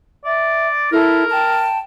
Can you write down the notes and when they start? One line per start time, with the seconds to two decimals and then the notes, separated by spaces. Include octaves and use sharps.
0.25 D5 E5
0.92 E4 A4 A#4
1.30 G5 A5